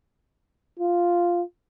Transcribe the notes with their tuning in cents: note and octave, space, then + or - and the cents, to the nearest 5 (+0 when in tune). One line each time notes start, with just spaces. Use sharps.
F4 +0